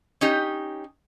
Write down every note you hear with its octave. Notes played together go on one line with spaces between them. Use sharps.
C#4 D#4 G4